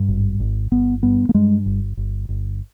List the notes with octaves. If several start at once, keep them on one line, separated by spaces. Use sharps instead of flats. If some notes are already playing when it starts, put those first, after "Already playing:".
Already playing: G2
G#1
G#1
G1 B3
G2 B3
A#3
G2 G#3
G1
G1
G1